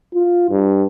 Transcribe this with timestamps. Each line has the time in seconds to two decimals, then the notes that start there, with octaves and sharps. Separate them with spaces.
0.14 F4
0.50 G2